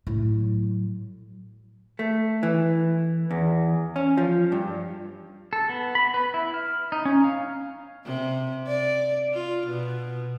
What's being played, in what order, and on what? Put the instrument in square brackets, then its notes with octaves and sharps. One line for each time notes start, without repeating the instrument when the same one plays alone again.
[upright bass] A2 F#3
[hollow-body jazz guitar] A3
E3
E2
C#4
F3
G2
[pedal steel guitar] A4
B3
B5
B4
E4
F6
D#4
C#4
F5
[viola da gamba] C3
D5
F4
B2